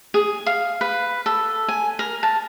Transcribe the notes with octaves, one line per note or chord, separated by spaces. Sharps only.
G#4
F5
B4
A4
G#5
A#4
A5